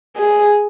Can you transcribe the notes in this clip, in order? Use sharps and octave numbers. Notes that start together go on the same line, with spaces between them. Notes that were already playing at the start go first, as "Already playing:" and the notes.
G#4